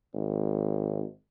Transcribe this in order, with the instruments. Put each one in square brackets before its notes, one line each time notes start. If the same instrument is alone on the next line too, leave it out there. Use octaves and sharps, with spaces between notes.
[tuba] G#1